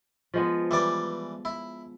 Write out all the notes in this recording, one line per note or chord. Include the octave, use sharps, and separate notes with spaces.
F3 G#3 B3
E3 G3 D5
E4